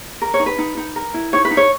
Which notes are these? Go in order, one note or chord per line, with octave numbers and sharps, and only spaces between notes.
A#4
C#5
D#4
B4
D#4
D#4
A#4
E4
D#4 C#5
B4
D#4
C#5